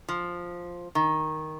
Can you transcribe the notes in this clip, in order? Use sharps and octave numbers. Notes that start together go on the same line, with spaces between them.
F3
D#3